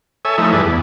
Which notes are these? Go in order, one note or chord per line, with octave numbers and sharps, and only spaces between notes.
A4 C#5 E5 G#5
F3 A3 D#4 E4
G2 E3 D4 G#4 A4 B4
E2